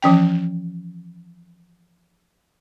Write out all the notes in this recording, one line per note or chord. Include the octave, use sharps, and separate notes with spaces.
E3 F3 C#4 G5